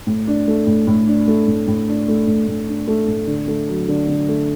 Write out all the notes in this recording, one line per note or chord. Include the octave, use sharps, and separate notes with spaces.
A2
D4
A3
A2
A2
D4
A3
A2
A2
D4
A3
A2
A2
D4
A3
A2
D3
A3
F#3
D3
D3
A3